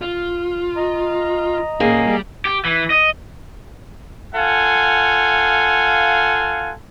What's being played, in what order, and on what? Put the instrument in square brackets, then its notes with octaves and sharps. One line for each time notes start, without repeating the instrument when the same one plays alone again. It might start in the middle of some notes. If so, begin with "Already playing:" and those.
[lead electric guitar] F4
[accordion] D#5 A#5
[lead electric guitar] A#2 C#4 [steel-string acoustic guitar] A#3 G#4
[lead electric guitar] G3
[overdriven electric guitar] G4
E3
D#5
[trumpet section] F4 A4 F5 F#5 G#5